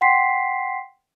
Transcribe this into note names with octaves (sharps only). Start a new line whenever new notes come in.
F#5 G5 C6 B6 C7